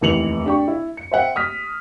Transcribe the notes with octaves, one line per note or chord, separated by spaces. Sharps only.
F1 D#2 E3 C#7 F7 F#7
D4 G4 C#6
E4
C#7
C5 E5 F#5 G5
D#6 F6 B6